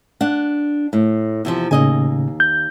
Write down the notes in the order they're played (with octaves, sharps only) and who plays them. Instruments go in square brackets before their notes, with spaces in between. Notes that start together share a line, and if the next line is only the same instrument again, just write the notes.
[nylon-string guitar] D4 F#5
A2
E2 C3 F3
[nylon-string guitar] D#2 D#5 G#5 [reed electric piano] A2 C#3
[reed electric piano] G6